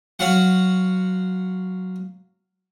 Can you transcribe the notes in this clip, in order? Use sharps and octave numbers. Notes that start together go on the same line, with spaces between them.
F#3 F4 F#4 F#5